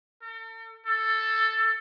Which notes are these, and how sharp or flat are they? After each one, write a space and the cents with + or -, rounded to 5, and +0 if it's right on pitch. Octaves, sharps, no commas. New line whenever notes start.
A4 +45
A4 +10